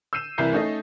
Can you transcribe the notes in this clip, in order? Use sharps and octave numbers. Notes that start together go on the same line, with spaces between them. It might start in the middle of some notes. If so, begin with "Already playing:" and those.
E6 G6 C7 D#7 E7
C2 E3 E4 A#4 G6 C7
A3 C#4 D#4 A4 D#5